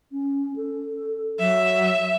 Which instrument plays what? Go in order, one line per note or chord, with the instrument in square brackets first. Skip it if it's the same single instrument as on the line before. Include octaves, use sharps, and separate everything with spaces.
[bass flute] C#4
A4
[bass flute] F#3 [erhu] E5